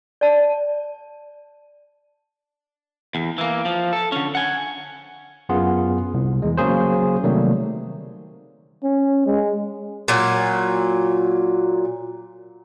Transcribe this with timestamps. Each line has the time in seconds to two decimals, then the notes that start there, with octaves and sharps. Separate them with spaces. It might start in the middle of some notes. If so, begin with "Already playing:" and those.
0.21 D5 A5
3.15 E2
3.38 E3 A#3
3.65 F3
3.93 A4
4.12 D3 C#4
4.35 F#5 G#5
5.49 F#2 B3 F4 G#4 F#5
6.14 C2
6.42 E2 G#3
6.57 C#3 F#3 A#3 G#4 C5
7.24 C3 D#3 F#3 G3 A3 A#3
8.83 C#4
9.26 G#3
10.08 A#2 F#3